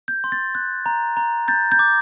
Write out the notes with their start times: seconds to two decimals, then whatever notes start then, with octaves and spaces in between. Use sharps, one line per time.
0.08 G6
0.24 C6
0.32 A6
0.55 F#6
0.86 A#5
1.17 A#5
1.48 G6 A6
1.72 G6
1.79 D6